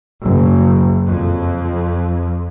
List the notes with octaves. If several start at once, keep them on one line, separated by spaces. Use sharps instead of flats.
F#1
F2